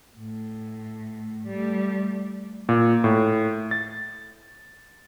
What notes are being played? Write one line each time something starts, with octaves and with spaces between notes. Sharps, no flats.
A2
G3 A3
A#2
A2
A6